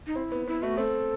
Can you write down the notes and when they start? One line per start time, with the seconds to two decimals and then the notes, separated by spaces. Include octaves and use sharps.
0.07 D#4
0.16 C4 E4
0.32 B3
0.47 B3 E4
0.62 A3 F#4
0.77 C4 A4